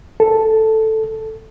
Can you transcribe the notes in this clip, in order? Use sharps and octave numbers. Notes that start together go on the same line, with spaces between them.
A4